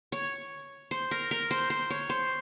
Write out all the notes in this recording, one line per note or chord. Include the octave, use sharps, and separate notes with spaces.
C#5
C5
A#4
A#4
C5
C5
C#5
C5